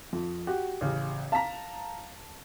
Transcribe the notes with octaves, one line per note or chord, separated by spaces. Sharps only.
F2
F#4 G4
A1 C#3
F5 A5 A#5 B6